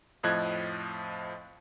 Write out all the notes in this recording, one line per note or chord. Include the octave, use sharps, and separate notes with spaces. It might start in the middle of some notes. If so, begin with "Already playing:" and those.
F2 A2 F3 D#5 F#6 G#6